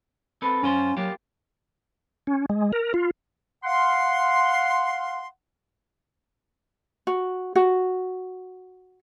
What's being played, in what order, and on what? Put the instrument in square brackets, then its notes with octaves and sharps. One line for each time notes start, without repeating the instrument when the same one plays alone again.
[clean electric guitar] C4 A4 B4
[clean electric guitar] F#2 F4 C5 [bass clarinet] C#4
[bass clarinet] F#3 [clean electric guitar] A#3 F4 G4
[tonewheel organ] C#4
G#3
A#4
F4
[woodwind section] F5 F#5 C6
[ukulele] F#4
F#4